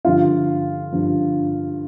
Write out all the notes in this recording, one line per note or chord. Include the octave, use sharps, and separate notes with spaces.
G2 D3 F3 F4
G2 D3 F3